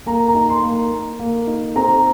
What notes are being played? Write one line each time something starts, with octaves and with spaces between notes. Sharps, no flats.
A#3 A#5
A#5
D#4
C6
A#3
A#5
A#3
A#3
D#4
C4 A#5